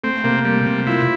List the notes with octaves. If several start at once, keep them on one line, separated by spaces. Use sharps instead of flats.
A3 C4
C3 A#3
G3
C3
E4 F4